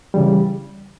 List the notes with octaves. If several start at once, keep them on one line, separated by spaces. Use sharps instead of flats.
C#3 E3 G3